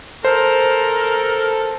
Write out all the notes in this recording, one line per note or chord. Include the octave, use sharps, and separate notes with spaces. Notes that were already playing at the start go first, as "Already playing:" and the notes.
A4 A#4 C5